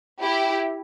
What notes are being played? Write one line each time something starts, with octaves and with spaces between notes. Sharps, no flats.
E4 G4